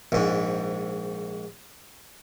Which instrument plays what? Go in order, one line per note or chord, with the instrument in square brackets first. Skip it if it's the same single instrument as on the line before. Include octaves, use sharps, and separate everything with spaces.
[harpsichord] A#1 G#2